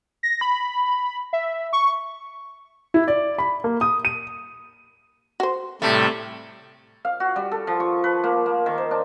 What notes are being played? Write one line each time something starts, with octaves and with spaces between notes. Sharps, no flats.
A#6
B5
E5
C#6
E4
D5
B5
A#3
D#6
D#7
F#4 C5
A2 C3 G3 A3
F5
F#4
G3
A4
F3
C#6
B4
A#3
A#3
D#3
C5
D4